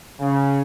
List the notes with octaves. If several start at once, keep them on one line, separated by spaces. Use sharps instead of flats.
C#3